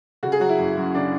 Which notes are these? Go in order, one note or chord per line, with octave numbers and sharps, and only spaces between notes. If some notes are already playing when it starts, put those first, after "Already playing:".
C#3 F#4
G#4
F#3 F#4
E4
F#1
F#2
C#3 D4